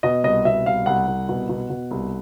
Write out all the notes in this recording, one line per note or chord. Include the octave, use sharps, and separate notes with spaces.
B2 D#5
C2 D#5
B2 E5
C2 F5
C2 F#5
C2
B2
B2
B2
C2